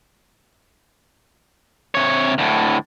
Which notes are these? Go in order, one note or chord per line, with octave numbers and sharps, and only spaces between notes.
C3 C#5
D2 A2